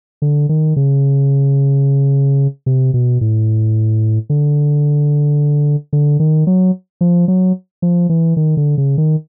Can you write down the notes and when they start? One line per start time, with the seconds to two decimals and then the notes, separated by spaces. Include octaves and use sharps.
0.22 D3
0.49 D#3
0.76 C#3
2.66 C3
2.94 B2
3.21 A2
4.30 D3
5.93 D3
6.20 D#3
6.47 F#3
7.01 F3
7.28 F#3
7.82 F3
8.09 E3
8.37 D#3
8.57 D3
8.78 C#3
8.98 D#3